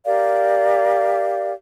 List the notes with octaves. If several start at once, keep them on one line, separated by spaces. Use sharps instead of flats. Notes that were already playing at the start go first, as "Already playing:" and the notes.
G4 A#4 D5 F5